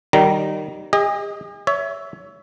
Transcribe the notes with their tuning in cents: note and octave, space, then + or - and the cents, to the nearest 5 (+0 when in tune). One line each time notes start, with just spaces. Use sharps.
D#3 -20 G3 -25 A#5 +0
G#4 -45 D#5 +10
C#5 +25 E5 +0